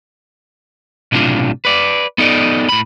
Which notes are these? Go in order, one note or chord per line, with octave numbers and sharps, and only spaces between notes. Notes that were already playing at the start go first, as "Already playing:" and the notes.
B1 A2 C3 D4 F4
B4 D5
B3 D#4 A4 D5 D#5
A2 B5